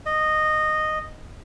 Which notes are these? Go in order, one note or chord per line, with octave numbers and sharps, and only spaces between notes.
D#5